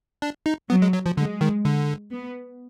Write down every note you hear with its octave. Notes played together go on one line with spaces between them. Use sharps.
D4
D#4
F#3 B3
G#3
F#3
F3
D3 G#3
D#3
D3
B3